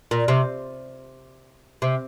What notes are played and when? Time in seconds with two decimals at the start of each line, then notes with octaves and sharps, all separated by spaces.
0.11 A#2
0.28 C3
1.82 C3